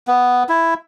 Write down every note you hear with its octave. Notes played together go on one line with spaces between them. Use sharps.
B3
E4